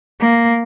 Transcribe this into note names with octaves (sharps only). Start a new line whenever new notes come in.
A#3